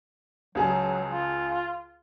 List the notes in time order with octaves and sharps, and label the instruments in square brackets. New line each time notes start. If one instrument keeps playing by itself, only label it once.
[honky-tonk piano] C#2 G#4 A5 [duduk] F#3
[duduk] F4